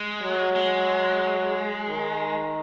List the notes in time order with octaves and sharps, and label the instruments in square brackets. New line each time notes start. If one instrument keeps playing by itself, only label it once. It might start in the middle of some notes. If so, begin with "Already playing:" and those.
Already playing: [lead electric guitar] G#3
[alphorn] F#3
[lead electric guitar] G#3
[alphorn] D#3